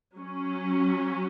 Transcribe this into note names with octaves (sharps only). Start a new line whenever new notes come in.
F#3 C#4